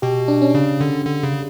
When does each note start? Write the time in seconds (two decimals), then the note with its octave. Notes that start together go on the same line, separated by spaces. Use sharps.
0.02 B2 G4
0.28 D4
0.42 C#4
0.55 C#3
0.81 D3
1.06 D3
1.23 C#3